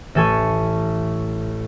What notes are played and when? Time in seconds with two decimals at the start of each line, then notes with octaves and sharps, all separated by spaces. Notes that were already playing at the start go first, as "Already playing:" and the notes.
0.15 A1 E3 A4 G#5 C#6